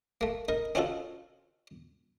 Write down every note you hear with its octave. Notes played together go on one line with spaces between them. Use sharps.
A3 A#3
D#4 A#4
C4 C#4 D#4 F4 F#4 A4